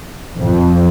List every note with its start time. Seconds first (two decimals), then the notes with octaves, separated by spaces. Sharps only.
0.40 F2